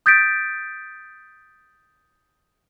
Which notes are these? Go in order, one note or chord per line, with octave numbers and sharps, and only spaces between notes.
D#6 G6 A6 B6 D7